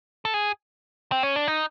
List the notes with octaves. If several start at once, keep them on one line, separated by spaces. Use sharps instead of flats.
A4
G#4
C4
C#4
D4
D#4